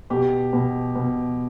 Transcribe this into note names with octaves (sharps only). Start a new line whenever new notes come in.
B2 G4
B2
B2